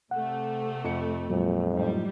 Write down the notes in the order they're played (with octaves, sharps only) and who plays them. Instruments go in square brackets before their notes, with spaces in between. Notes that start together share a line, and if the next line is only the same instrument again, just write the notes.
[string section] C3 A3 [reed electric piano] F#5
[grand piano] F2 C#7
[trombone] F2 [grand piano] A#2 [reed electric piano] F#3 G#3
[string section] F#2 G3 [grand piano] A2 F3 D#4